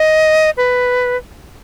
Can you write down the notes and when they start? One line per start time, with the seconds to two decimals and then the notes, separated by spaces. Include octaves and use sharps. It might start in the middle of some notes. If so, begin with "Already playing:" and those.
Already playing: D#5
0.57 B4